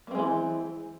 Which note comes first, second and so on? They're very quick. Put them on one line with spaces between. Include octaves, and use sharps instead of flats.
A#3 C4 G#3 E3